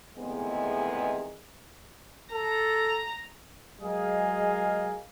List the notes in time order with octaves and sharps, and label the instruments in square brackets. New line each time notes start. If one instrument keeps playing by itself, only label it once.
[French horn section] E2 A2 C3 D#3 G#3 B3
[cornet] A4 [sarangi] A#5
[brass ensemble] F#3 G#3 G#4 A#4 D#5 F5